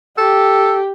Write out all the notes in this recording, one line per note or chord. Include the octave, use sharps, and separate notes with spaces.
G4 A4